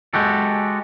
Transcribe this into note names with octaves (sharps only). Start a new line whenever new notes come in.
G#3 F#4 G4 A4